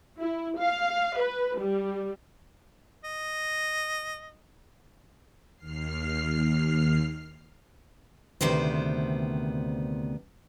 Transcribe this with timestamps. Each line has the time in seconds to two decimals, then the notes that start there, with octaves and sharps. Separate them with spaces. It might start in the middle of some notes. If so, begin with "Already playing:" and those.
0.19 E4
0.59 F5
1.18 B4
1.60 G3
3.05 D#5
5.57 D#2 F6 C7
8.41 D2 C3 D#3 B3 C5